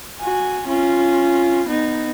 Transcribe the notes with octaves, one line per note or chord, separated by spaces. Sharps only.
F#4 G#5
C#4 F4
B3 D#4